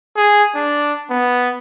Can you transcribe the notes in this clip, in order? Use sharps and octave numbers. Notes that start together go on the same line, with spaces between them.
G#4
D4
B3